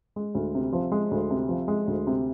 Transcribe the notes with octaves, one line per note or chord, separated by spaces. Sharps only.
G#3
D2
C3
F3
G#3
D2
C3
F3
G#3
D2
C3